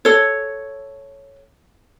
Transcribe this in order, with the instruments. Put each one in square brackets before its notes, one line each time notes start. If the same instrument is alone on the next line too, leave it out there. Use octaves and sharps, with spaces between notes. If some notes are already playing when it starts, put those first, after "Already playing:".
[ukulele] A4 C#5